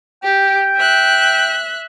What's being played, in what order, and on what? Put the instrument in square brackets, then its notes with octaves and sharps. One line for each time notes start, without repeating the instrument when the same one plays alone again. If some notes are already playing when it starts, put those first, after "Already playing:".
[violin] G4 [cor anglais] G5
[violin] E5 F#6